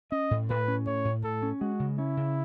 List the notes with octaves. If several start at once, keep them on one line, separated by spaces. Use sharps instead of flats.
C#4 D#5
A2
A2 B4
C#4
A2 C#5
A2
A2 A4
C#4
G#3 F#4
C#3
C#4 E4
C#3